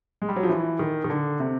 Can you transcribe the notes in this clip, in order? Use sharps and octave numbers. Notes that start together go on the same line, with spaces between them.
G#3
G3
F#3
F3
E3
D#3
D#3
D3
C3